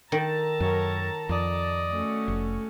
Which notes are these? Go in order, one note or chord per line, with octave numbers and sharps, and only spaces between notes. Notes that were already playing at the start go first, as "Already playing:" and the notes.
D#3 A4 A5 A#5
F#2 A#4 C#5
F2 D5 D#5
A3 C#4 F#4
F1